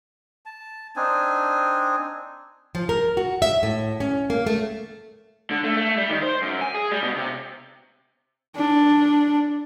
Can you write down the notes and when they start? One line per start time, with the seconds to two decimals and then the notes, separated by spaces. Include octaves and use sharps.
0.46 A5
0.96 C4 D4 D#4 G#5
2.75 F3
2.89 A#4
3.17 F#4
3.42 E5
3.63 A2
4.00 C#4
4.30 A#3
4.47 A3
5.51 D3
5.64 A3
5.77 A3
5.97 G3
6.10 D#3
6.22 C5
6.42 F#2
6.61 G#5
6.74 G#4
6.91 G3
7.03 B2
7.17 C3
8.56 D4